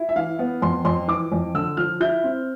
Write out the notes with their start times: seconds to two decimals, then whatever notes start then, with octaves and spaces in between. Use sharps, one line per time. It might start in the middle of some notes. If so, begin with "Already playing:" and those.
Already playing: E4
0.09 E5
0.16 E3 F5
0.39 B3
0.62 F2 C6
0.85 F2 C6
1.08 E3 D6
1.32 F2
1.54 D3 E6
1.77 F3 F6
2.00 E4 G6
2.24 C4